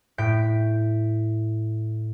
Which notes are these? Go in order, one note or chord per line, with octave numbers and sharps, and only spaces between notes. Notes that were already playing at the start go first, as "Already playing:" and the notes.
A2 G6 B6 D7